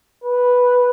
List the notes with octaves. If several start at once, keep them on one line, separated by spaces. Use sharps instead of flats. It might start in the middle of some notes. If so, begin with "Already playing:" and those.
B4